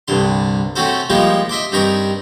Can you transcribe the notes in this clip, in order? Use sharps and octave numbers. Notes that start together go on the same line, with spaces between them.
C2 G2 D3 C6
A3 C4 C#4 F#4 A4 C5
F3 G3 G#3 A#3 D#4 F4
D#5 E5 C6 D6
G2 C4 D#4 A#4 C#6